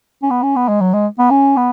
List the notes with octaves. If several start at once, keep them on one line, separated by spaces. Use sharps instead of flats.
C#4
B3
C#4
B3
G#3
F#3
G#3
B3
C#4
B3